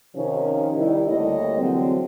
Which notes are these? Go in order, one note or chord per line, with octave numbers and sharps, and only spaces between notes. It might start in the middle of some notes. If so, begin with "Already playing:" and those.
C3 D#3 F3 C#4
D#3 G3 D#4 E4
D2 G3 A3 A#3 C#5 D#5
D3 E3 F#3 G#3 C4